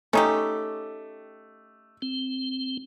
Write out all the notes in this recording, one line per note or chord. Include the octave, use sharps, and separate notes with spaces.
A3 C#4 D#4 G4
C4